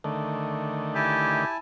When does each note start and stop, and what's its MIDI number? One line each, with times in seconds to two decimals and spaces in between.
0.04 1.45 50
0.04 1.45 51
0.04 1.45 57
0.95 1.57 64
0.95 1.47 67
0.95 1.57 80
0.95 1.57 81